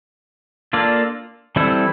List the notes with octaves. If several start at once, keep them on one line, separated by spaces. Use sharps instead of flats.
A#3 D4 F4 A4 D5
E3 G3 C4 E4 A4